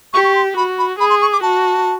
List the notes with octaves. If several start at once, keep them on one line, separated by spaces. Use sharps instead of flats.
G4 C#6
C#6
C6
F#4 B5
B5
G#4 B5
C6
C#6
D6
F#4 A5